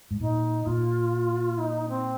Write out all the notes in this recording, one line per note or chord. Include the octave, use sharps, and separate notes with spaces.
G#2
A#2 D#4
A#2 F4
D#4
C4